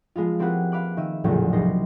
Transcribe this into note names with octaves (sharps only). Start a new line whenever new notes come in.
F3 G#3 B3 F4
A#3 C4 E4 G4 B4 F#5
F5 B5 D6 F#6
D#3 E5 D#7
A#1 E2 A2 C#3 F3 F#3
C2 D#4 D#5 C6 A#6